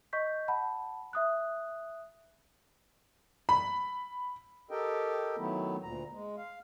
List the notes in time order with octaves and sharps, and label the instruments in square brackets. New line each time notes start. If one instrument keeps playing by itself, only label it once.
[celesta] D#5 C#6 G6 B6
F#5 A5 B5
E5 D#6 F#6
[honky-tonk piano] B5
[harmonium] G4 A4 A#4 D#5 G5
D#3 F#3 A3 B3 E4
D2 A#2 A#5
G#3
F5